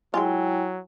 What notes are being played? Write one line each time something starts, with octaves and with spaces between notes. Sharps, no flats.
F#3 G#3 E4 F4 G5 G#5